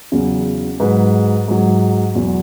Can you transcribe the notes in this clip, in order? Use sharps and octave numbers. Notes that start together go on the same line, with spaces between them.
E2 C#3 F#3
G#2 F#3 B4
G#2 F#3
E2 B2 F#3